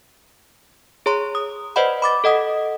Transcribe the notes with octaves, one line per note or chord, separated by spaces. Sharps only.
G#4 C#5 A#5 C6
D#6
B4 C5 D5 D#5 F#5 B5
B5 D6 A6
A4 D#5 F#5 D#6